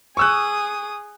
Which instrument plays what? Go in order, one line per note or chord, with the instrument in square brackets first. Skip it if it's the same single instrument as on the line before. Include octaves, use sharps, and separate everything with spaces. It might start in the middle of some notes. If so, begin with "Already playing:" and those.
[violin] G#4 D#6 [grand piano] C#6 E6 F#6